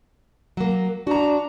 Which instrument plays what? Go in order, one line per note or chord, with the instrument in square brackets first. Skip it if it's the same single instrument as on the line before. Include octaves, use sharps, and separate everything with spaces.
[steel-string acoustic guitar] F#3 A#3
[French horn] D4 [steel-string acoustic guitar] F#4 A#5